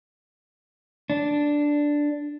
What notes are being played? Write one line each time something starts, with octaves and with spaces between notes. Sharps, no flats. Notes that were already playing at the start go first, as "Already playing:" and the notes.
D4